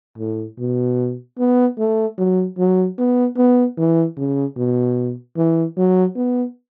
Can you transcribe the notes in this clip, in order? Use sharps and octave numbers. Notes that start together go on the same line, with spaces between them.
A2
B2
B3
A3
F#3
F#3
B3
B3
E3
C#3
B2
E3
F#3
B3